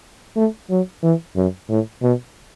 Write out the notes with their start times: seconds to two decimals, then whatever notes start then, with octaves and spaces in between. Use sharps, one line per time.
0.37 A3
0.70 F#3
1.03 E3
1.36 F#2
1.69 A2
2.03 B2